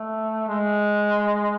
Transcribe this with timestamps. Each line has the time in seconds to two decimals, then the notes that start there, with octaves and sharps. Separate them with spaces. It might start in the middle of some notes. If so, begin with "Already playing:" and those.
Already playing: A3
0.48 G#3